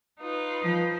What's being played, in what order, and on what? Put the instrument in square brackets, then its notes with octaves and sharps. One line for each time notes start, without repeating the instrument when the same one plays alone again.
[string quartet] D#4 F4 B4
[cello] F3